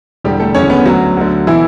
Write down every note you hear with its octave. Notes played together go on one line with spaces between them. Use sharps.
E1 E2 D3 G3 G4
A3 A4
F#1 E2 D3 C#4 C#5
B3 B4
D2 D3 F#3 F#4
D2 D3
B2 E3 E4